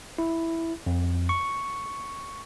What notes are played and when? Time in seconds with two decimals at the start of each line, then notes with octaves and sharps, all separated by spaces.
0.19 E4
0.86 F2
1.29 C#6